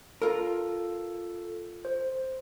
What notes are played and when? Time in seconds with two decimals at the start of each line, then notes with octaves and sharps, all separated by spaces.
0.22 F4 A4 A#4
1.85 C5